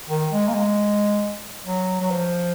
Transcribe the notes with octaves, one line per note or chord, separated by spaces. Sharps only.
D#3
G#3
A#3
G#3
F#3
F#3
F3